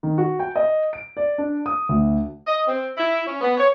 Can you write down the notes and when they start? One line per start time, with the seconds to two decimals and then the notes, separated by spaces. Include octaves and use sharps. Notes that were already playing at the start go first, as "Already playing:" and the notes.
0.03 D#3
0.18 F#4
0.39 G5
0.56 D#5
0.93 D7
1.17 D5
1.38 D4
1.66 D#6
1.89 D2
2.47 D#5
2.67 C4
2.98 E4
3.27 C#4
3.41 B3
3.58 C#5